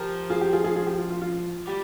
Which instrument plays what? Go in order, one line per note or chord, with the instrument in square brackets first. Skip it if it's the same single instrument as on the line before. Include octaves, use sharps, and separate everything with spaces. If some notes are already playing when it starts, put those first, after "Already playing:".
Already playing: [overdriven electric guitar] F3 [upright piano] G4 A#4
[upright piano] F4 G#4
G4
F4 G#4
F4 G#4
F4 G#4
G4
F4
F4
F4
[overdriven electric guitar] G3 [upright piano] G4